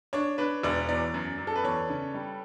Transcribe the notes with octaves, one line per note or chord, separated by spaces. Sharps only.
D4 C#5
D4 B4
E1 D5
E2 D5
F#2
F#2
A4
B4
E2 C#5
C#3
G3